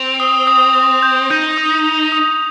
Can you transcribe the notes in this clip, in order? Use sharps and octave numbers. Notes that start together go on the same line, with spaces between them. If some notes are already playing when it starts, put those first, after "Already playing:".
Already playing: C4 F7
D#6
D#6
D#6
G6
D#4 G6
D#6
F7
D#6